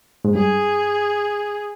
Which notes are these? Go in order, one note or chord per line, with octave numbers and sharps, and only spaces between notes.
G#2
G2 G#4